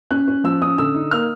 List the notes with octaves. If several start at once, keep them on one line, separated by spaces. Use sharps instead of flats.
C#4 F#6
C#4
F3 E6
C#4 D#6
D3 E6
D#4
A#3 F6